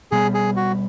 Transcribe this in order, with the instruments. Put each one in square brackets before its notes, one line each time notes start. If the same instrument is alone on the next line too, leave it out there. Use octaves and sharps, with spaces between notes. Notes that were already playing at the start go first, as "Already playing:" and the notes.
[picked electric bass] B2 G3 B3 [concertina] G#4
[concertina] G#4
F#4